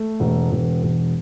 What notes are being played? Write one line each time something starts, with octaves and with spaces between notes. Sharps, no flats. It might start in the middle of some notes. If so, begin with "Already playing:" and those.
Already playing: A3
E1
E1
E1